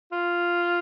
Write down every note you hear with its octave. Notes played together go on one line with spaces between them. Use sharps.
F4